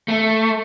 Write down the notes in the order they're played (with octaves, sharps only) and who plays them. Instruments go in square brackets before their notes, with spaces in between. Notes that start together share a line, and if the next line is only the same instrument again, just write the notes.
[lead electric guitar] A3